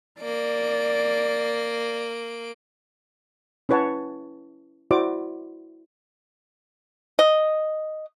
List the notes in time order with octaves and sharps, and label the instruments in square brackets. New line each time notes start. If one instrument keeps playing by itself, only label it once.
[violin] A#3 D7 [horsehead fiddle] D5
[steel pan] C#4 E4 B4 C#5 F#5 A5
E4 F#4 C5 D5 D6
[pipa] D#5